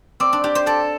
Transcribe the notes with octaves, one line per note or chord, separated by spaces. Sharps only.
C4 D5
D4
D4 G4
C5
A4 D5